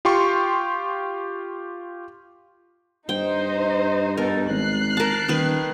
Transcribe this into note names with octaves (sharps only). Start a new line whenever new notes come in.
F4 G4 G5 C6 C#6
G2 D#4 C5 D#5 G5
B2 D#4 A4 A#4
G#1 F#6 C7
A#4 A5
D#1 D#3 B4